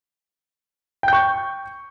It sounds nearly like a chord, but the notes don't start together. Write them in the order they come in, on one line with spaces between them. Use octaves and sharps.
G5 G6 C#6